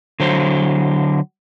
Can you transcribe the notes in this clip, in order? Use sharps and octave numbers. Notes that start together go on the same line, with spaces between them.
D3 F#3 C5